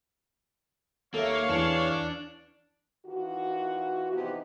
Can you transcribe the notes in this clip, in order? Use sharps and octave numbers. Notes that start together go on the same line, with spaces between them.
D#2 A#3 A4 C#5 E5 F5
E2 E3 D4 C#7 E7
D#3 E3 F4 F#4
C3 E3 F3 B3 D#4 G4